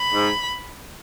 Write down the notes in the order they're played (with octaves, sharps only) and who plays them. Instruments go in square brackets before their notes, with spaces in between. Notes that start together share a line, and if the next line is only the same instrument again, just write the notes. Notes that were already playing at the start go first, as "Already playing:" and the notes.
Already playing: [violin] B5
[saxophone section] G#2